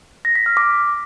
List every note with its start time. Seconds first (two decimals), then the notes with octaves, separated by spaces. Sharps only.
0.25 A#6
0.35 B6
0.46 F6
0.57 D6